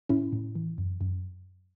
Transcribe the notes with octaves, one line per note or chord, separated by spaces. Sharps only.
A2 C#4 E4
A2
E3
F#2
F#2